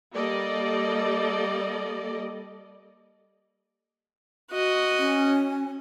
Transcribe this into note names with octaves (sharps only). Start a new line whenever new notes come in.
G3 A#3 A4 D5 D#5
F#4 D#5
C#4